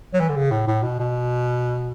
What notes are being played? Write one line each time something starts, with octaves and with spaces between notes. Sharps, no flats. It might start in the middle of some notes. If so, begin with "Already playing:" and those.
F#3
E3
D3
C#3
A2
A2
B2
B2